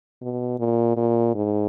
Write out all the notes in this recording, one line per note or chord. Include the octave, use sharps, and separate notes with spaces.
B2
A#2
A#2
G#2